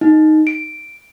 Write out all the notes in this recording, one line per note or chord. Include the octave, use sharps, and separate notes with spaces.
D#4
D7